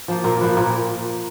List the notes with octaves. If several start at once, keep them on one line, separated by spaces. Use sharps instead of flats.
F3 A#3
A#2 A#4
F3 A#3 B4
A#2 A#4